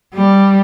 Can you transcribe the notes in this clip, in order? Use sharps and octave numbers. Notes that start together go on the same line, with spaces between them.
G3